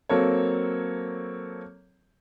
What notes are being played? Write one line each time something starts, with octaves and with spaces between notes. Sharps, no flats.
F#3 A#3 C4 A4 C#5